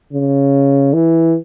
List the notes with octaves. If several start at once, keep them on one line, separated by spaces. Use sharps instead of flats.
C#3
E3